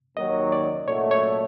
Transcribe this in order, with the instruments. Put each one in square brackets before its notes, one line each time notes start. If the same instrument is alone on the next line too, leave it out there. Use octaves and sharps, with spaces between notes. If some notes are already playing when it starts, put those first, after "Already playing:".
[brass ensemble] D#2 D#3 F#3 [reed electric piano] D#5
[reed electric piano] D5
[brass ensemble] A#2 F#3 A3 [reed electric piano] C#5
[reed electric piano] C#5